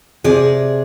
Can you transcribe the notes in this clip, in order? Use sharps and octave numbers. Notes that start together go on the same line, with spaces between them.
C3 G#4 D5